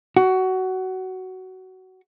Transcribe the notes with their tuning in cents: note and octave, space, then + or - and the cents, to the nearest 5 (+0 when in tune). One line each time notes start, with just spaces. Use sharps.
F#4 +15